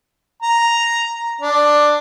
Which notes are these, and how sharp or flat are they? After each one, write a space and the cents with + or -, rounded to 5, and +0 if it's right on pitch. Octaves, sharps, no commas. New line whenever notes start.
A#5 +0
D4 +10